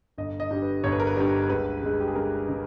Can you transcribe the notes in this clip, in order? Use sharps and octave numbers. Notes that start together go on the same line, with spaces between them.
G1 D#5
D#5
G2 G3
B4
G1 C#5
B4
A#4
B4
G2 G3
C#2 B4
C#3 G#3
G4
G#4
C#2 A#4
C#3 G#3